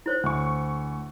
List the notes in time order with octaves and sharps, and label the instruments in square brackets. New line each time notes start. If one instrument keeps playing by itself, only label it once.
[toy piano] E4 C5 C#5
[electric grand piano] D2 C#6